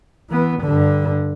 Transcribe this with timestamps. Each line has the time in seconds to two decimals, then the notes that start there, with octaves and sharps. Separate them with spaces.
0.30 E3 B3
0.61 G2 D3